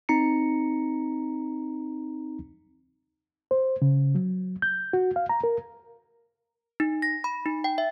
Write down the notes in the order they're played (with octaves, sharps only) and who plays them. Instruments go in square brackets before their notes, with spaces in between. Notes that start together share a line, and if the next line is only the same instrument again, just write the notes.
[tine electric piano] C4 D#4 A#5 C#7
[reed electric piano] C5
C#3
F#3
G6
F#4
F5
A#5
A#4
[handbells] D#4
A#6
B5
D#4
G5
E5